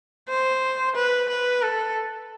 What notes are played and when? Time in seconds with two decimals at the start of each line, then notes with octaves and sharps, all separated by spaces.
0.29 C5
0.96 B4
1.29 B4
1.62 A4